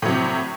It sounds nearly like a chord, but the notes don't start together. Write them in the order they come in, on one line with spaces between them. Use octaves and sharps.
A2 F#3 C3